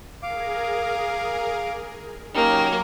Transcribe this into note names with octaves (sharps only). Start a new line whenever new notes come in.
G#4 A#4 F5 D6
F#3 A#3 C#4 D#4 G4 C#5 D6